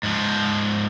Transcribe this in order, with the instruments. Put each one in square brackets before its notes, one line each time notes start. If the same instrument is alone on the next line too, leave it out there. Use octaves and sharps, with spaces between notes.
[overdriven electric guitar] G#2 F3